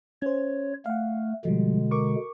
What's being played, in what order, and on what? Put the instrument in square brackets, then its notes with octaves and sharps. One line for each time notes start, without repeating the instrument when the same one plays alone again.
[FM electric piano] C#4 C5 [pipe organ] C#5
[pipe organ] A3 [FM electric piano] F5 F#5
[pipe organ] B2 D3 G#3 [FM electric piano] F3 G3
[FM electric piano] A#4 C#6 D6